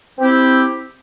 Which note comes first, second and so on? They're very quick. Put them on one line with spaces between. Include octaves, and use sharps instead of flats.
C4 G4 E4